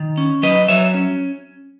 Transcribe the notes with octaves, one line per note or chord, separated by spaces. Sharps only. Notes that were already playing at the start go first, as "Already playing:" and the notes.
Already playing: D#3
C#4
F#3 B4 D#5
F#3 C#5 E5
C#4